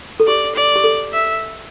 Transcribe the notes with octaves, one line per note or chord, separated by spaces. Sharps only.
A4
G4 D5
D5
G4
A4
E5